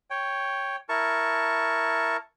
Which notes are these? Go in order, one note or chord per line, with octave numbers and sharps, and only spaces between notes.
C#5 G5
E4 A#4 A5 C#6